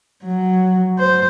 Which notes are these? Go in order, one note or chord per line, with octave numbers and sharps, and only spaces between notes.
F#3
C5